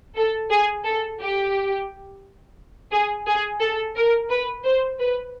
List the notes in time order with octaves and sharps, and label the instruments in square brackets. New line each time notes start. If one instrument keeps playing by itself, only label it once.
[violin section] A4
G#4
A4
G4
G#4
G#4
A4
A#4
B4
C5
B4